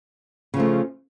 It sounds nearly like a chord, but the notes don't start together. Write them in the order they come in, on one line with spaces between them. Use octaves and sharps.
C#3 F3 A3